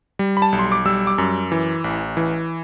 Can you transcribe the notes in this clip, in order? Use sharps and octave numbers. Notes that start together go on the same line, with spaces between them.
G3
B5
A5
B1
C6
D6
G3 E6
D6
F#2
E3
A1
E3